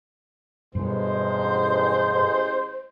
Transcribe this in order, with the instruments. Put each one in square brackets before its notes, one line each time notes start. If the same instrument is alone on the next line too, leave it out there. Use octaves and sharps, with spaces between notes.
[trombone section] A1 G#3 [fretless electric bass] G2 B2 [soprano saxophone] C5